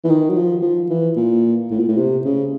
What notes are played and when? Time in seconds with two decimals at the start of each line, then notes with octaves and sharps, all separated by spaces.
0.04 E3
0.09 D#3
0.29 F#3
0.36 F3
0.62 F3
0.90 E3
1.17 A#2
1.71 A2
1.80 A#2
1.88 A2
1.98 C3
2.25 C#3